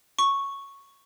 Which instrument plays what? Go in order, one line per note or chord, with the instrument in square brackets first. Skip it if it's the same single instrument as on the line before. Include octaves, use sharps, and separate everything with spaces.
[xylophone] C#6